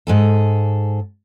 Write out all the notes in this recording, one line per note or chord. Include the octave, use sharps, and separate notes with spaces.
G#2 G#4 A4